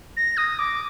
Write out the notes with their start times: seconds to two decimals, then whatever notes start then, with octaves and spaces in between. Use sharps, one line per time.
0.17 A#6
0.37 D#6
0.59 D6